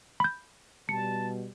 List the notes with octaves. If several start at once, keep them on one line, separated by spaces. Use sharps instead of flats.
B5 G6
B2 G3 A5 C#7